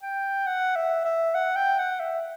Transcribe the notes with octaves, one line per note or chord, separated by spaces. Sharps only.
G5
F#5
E5
E5
F#5
G5
F#5
E5